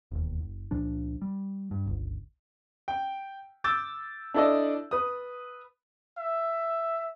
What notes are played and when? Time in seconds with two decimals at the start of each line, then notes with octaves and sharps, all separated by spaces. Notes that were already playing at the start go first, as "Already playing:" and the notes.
0.12 E1 D#2
0.39 F#1
0.71 C#2 A#2 F3 D4
1.22 G3
1.71 G2
1.86 D1 G1 C#2
2.88 G5
3.64 D6 E6 G6 A6
4.34 D4 E4 A4 D5 D#5
4.91 B4 D#6
6.18 E5